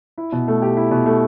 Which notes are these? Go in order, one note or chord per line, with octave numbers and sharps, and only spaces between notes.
E4
B2
A3
G4
E4
B2
A3